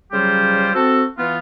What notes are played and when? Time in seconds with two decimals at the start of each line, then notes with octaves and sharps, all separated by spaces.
0.12 C#3 F#3 G3 F4 G4 C5
0.75 C4 F#4 A4
1.17 E3 B3 F4